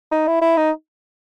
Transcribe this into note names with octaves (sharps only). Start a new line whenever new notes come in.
D#4
E4
E4
D#4